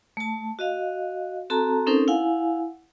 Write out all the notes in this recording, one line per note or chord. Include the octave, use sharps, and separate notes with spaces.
A3 A5
F#4 D#5 F5
C4 F#4 A4 A5 A#5
C4 C#4 D#4 A4 A#4 C5
E4 F5 F#5 G#5